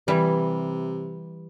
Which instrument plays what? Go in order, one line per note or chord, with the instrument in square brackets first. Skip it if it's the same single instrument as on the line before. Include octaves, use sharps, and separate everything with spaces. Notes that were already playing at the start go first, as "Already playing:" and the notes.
[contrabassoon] C3 [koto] E3 G3